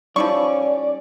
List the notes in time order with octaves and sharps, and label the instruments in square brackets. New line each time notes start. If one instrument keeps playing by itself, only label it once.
[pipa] F3 E4 C#6 [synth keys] G3 D#4 [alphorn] C#4 [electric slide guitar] D5